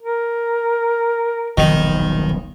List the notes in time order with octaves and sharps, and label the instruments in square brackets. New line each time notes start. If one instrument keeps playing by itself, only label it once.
[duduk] A#4
[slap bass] D#1 B1 F3 [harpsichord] D#3